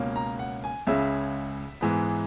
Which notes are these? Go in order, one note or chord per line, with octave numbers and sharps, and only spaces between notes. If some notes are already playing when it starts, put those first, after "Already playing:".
Already playing: C#2 B2 A#3 C#4
A#5
F#5
G#5
C#2 C#3 G#3 C#4 E5
G#2 E3 G#3 B3